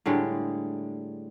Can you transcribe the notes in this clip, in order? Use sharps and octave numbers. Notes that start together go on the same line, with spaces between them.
A2 D3 G3 G#3